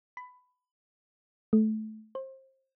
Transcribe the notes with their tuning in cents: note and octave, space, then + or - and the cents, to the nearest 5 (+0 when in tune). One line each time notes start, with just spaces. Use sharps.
B5 +15
A3 -20
C5 +25